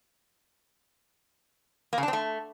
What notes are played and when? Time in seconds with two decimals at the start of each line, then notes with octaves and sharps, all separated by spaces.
1.93 A#3
1.98 C#3
2.03 D4
2.08 C4
2.13 A3